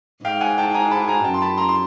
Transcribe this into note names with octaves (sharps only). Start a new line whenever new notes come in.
G#2 F5 G5
F#5 G#5
G5 A5
G#5 A#5
A5 B5
G#5 A#5
F#2 G5 A5
C6
A5 B5
A#5 C6
C6